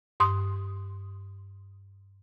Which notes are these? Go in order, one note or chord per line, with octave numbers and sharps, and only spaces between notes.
G2 C6 D#6